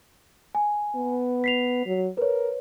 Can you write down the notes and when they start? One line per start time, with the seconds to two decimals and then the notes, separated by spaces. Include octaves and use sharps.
0.55 G#5
0.95 B3
1.44 B6 C7 F7
1.86 F#3
2.18 A#4 B4 C#5